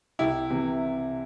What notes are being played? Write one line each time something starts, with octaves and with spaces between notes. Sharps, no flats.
C2 E4 G4
C3 E3